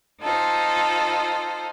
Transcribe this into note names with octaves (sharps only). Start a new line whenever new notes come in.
D#4 F4 A4 C5